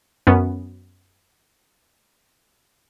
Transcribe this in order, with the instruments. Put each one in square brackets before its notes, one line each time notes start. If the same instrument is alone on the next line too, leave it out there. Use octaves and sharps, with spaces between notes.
[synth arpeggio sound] F#2 B3 C#4